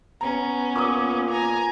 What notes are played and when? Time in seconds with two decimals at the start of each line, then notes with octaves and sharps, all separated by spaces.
0.21 B3 C#4 A#5
0.76 A#2 D6 D#6
1.31 G#5 A#5